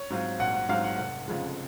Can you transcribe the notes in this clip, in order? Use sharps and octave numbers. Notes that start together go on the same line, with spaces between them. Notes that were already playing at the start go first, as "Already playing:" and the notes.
Already playing: C#5 C#6
G#2 F#3 C4 F4
A#1 F#5
F#5
G#2 F#3 C4 F4 F5
F#5
F1 F#5
F2 C#3 F3 G#3